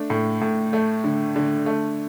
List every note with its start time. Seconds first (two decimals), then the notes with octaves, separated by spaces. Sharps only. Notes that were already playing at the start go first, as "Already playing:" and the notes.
Already playing: A3 D4
0.10 A2
0.41 A2
0.73 A3
1.04 D3
1.36 D3
1.66 A3